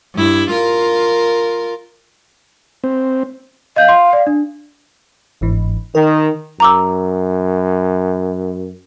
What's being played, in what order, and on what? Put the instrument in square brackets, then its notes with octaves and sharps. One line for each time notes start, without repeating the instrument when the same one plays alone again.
[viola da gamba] G2 E4
F4 A#4
[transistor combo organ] C4
[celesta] D#5 G6 [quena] F5
[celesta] C6
D5
D4
[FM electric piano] G1 G#2 E3
[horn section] D#3 [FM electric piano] A#4
[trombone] F#2 [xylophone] A#5 D6 E6